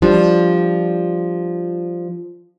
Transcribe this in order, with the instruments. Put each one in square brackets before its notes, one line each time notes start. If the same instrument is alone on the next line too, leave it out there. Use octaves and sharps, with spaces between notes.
[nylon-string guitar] F3 G3 D4